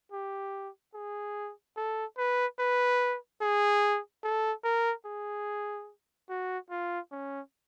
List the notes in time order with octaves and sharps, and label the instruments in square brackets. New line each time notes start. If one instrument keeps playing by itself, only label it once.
[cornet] G4
G#4
A4
B4
B4
G#4
A4
A#4
G#4
F#4
F4
C#4